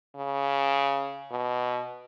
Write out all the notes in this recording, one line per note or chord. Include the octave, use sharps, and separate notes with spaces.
C#3
B2